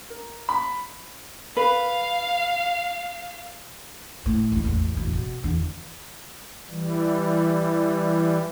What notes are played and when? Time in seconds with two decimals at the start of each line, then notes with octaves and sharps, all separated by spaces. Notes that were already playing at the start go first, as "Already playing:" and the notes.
0.10 A#4
0.49 B5
1.57 B4 F5
4.26 A2
4.52 A1 F2
4.65 A1 E2
4.95 E1 A1
5.13 B2
5.44 E2 D3
6.69 E3 G3